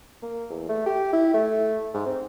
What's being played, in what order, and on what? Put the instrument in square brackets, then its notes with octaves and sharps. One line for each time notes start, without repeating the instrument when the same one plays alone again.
[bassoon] A#3
E2
A3
G4
E4
A3
G#2
C4